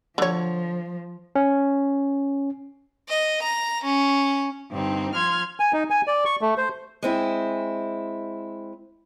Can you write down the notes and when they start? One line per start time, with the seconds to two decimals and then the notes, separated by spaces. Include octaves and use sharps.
0.18 D3 F3 C#5
1.36 C#4
3.09 D#5
3.43 A#5
3.85 C#4
4.71 G2 D3 C4 D#4
5.14 F3 C6 F6 G#6
5.60 G#5
5.73 D#4
5.90 G#5
6.07 D5
6.25 C#6
6.41 A3
6.58 C5
7.02 G#3 C4 E4